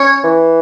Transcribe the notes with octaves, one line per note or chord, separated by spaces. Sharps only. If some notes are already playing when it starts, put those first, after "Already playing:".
Already playing: C#4 C#5
E3